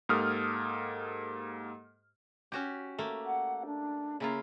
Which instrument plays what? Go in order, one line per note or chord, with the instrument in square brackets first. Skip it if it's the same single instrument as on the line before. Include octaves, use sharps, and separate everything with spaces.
[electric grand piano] G#2 A#3 G4 A4 D#6 F6
[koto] C#4 F#4 G4
A3 A#3
[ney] F#5
D4
[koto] C#3 E4 F4 [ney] A#3